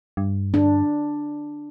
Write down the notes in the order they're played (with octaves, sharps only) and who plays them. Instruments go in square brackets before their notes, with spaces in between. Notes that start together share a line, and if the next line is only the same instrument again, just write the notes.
[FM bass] G2
[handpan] D4